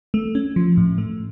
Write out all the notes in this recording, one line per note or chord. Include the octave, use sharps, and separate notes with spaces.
A3
C#4
F3
A2
A3